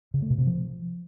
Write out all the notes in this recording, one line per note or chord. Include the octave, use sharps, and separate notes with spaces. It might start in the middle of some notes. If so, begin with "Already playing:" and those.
C#3
A3
B2
C3
F3